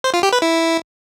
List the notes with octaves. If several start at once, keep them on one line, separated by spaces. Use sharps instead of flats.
C5
F4
G4
B4
E4